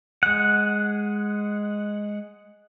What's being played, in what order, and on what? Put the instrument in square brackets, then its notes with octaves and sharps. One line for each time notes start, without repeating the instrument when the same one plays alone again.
[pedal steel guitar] G#3 F#5